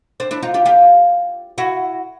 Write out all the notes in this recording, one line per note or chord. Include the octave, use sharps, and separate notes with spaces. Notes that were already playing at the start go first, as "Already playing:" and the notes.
C4 D4
D4 E4
D#4 F4
F4 G4
F4 G4
E4 F#4